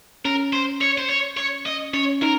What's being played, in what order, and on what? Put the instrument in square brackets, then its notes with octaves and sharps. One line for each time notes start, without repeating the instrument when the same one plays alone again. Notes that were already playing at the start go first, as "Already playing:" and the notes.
[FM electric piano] C#4 [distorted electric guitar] A#4
[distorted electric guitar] C5
C#5
C5
C#5
C#5
D#5
[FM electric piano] C#4 [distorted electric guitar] C#5
[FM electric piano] D#4 [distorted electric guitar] A#4